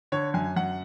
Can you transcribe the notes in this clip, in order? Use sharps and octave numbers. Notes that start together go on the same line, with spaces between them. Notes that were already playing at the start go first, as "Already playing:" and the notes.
D3 C#5
F#2 G#5
F#2 F#5